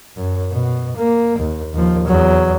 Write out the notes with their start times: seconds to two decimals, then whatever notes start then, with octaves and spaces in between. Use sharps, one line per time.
0.17 F#2
0.51 B2
0.97 A#3
1.39 D#2
1.74 D#2 F3
2.07 E2 F#3